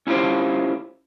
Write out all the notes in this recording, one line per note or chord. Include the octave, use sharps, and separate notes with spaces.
C#4 E4 F4 G4 C5